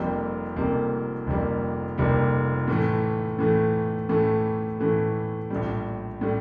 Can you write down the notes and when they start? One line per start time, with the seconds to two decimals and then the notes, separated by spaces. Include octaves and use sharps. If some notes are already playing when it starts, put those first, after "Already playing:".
Already playing: F1 F2 C3 G3 A#3
0.56 F1 F2 C3 G3 A#3
1.27 F1 F2 C3 G3 A#3
1.98 F1 F2 C3 G3 A#3
2.68 A2 E3 A3
3.39 A2 E3 A3
4.09 A2 E3 A3
4.80 A2 E3 A3
5.50 A#1 A2 G3
6.21 A2 G3